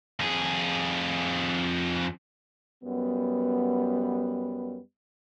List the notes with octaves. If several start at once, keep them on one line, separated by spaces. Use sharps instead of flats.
F2 G#4
F#2 G3 B3